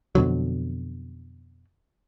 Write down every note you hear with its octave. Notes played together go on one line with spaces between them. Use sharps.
F2 B2 D3 F#3